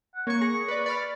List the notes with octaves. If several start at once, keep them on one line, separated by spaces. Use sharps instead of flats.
F#5
A#3 C#5 C#6
G#4 C#6 A#6
B4 D5
D5 B5 F6